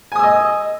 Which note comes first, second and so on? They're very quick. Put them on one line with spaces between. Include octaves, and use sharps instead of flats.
G#5 D#6 E6 D#5